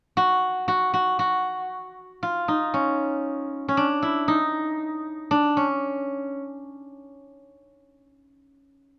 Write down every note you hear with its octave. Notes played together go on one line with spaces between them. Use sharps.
F#4
F#4
F#4
F#4
F4
D#4
C#4
C#4
D4
E4
D#4
D4
C#4